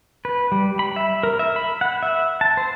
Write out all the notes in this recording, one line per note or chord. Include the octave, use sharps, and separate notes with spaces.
B4
G3
B5
E5
A#4
E5
B5
F#5
E5
A5
C5